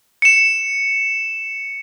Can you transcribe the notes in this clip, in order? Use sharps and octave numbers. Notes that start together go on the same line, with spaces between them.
C#7 E7